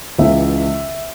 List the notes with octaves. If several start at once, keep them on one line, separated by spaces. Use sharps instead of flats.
C#2 C#3 E3 E5